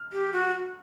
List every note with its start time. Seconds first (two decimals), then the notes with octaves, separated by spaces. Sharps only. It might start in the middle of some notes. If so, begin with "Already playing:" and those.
Already playing: F6
0.12 G4
0.33 F#4